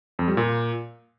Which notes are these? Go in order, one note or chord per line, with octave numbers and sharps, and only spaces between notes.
F2
G3
A#2